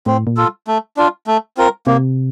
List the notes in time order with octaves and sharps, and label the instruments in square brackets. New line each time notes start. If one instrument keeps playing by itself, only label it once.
[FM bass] A2 [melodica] C4
[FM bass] A#2
[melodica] F4 A4
A3
D4 F4
A3
C4 F4 A#4
[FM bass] C3 [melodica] A#3